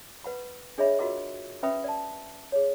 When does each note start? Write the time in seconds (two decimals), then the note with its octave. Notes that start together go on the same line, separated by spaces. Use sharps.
0.24 B4 F#5 B5
0.78 D4 G#4 C#5 D#5 E5 B5
0.99 F4 F#4 A#4 D#5 F#5 D6
1.63 C#4 B4 E5 G5 B5 D#6
1.84 D5 A5
2.52 G#4 C#5